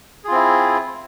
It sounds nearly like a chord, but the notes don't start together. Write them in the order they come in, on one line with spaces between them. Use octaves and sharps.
G#4 F4 C4 E4